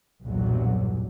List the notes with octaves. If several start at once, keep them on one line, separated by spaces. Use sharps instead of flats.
B1 E2 G2 A#2 F#3